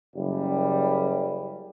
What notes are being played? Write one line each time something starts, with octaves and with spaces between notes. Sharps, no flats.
F#1 G3